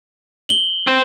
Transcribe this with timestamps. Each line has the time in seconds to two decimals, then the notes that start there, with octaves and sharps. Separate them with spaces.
0.49 F#7 G7
0.87 C4 C5